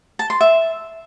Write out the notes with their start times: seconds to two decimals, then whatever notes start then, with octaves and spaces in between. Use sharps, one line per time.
0.19 A5
0.30 C6
0.41 E5